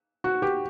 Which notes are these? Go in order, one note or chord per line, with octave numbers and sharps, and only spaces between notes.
F#4
G4